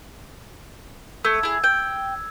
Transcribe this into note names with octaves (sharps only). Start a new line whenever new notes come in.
A3 E6 G#6
E4 G#4
G5